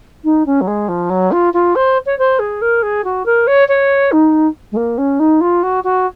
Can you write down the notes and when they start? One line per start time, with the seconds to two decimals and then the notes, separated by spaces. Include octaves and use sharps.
0.24 D#4
0.46 C#4
0.61 F#3
0.67 G#3
0.88 F3
1.10 F#3
1.31 F4
1.53 F4
1.75 C5
2.06 C#5
2.18 C5
2.39 G#4
2.61 A#4
2.82 G#4
3.04 F#4
3.26 A#4
3.47 C#5
3.68 C#5
4.12 D#4
4.72 G#3
4.76 A#3
4.98 C#4
5.19 D#4
5.41 F4
5.63 F#4
5.84 F#4